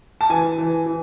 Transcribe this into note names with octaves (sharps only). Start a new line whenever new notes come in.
A5
E3 G#5
E3
E3